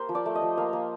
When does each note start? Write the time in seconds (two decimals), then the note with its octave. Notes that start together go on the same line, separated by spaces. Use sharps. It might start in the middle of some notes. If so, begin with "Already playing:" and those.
Already playing: A#3 G4 A#4 C5
0.09 F3
0.15 D5
0.26 A3
0.35 D#5
0.42 F3
0.57 A#3 F5
0.73 A#3